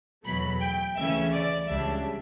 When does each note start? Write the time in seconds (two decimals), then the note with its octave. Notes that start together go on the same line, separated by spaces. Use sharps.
0.26 E2 B2 F#3 A3 B5
0.61 G5
0.96 D2 C#3 E3 A3 C#4 E5
1.32 D5
1.68 C#2 C#3 G3 D4 E5